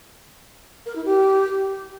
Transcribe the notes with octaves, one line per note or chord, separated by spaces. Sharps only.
A#4
E4
G4